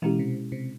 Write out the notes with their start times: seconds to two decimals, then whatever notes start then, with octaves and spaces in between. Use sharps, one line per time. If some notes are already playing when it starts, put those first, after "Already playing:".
0.02 B2 E3 G#3 C#4 E4 G4
0.19 C3
0.52 C3